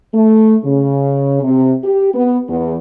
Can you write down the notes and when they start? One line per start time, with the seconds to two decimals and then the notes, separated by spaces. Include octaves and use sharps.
0.14 A3
0.65 C#3
1.43 C3
1.84 G4
2.14 B3
2.48 E2